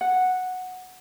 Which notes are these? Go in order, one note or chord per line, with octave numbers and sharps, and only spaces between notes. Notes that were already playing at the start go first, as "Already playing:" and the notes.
F#5